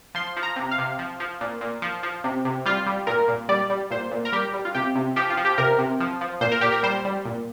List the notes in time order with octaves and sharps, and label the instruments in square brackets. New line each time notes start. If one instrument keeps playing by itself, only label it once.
[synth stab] F3 C6
F3
A#5
C3
F5
C3
F3
F3
A#2
A#2
F3
F3
C3
C3
G3 F4
G3
A#2 A#4
A#2
G3 D5
G3
A#2 C5
A#2
A#4
G3 G4
G3
F4
C3 G4
C3
F3 G4
F4
F3
G4
C3 A#4
C3
F3
F3
A#2 C5
A#4
A#2 G4
A#4
G3 C5
G3
A#2